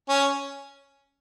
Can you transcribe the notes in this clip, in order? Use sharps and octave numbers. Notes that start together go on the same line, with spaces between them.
C#4